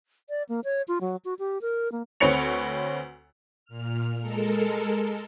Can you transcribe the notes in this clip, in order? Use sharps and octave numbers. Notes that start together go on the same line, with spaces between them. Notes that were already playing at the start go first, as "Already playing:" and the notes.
D5
A#3
C#5
F4
F#3
F#4
G4
A#4
A#3
D2 C4 B4 C#5 C#7 F7
A#2 F6
G#3 A4 A#4